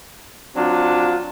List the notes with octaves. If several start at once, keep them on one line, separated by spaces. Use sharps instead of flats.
F#3 C4 D4 F4